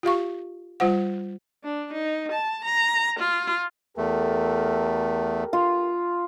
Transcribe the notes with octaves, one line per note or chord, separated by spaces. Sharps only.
F4 G4 F5 C#6
G3 F4 C5 F#5
D4
D#4
A5
A#5
F4
E2 A3 G4 A4 A#4
F4